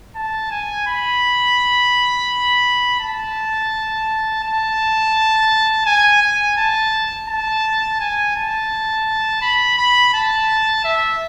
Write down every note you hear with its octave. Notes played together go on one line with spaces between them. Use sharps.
A5
G#5
B5
A5
A5
G#5
G#5
A5
A5
G#5
A5
B5
B5
A5
E5